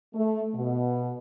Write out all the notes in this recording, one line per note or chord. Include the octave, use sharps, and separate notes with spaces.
A3
B2